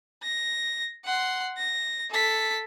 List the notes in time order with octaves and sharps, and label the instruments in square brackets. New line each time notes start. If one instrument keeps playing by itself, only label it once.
[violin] A#6
F#5 C6
A#6
A4 B6